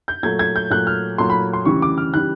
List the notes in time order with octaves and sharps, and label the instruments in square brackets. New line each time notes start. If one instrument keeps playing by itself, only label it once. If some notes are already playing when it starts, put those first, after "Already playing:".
[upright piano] G6
A#2 F#3 A3 G#6
G#6
G6
A#2 F#3 A3 F#6
F6
A#2 F#3 A3 C6
B5
C6
D2 C#3 E3 G3 C#6
D6
F6
C#3 E3 G3 F#6